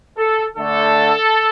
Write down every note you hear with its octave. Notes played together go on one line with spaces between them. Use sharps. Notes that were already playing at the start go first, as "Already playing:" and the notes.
A4
D3 A3 A4